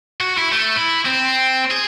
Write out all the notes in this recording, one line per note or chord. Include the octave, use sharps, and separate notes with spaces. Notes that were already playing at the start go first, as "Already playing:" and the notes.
F#4
E4
A3
E4
C4
G#4